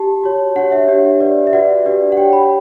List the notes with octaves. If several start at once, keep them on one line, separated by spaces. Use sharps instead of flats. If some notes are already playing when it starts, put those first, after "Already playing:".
Already playing: G4 A5
F#4 C#5
D4 G4 C#5 F#5
E5
D4 G4 C#5
G4 B4 D5
E5
F#4 B4 D5 F#5
D4 G4 B4 D5
F#5
G4 C#5 G5
B5